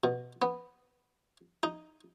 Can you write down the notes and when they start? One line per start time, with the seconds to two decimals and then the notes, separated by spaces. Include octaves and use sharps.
0.04 B2
0.42 B3
1.63 D#4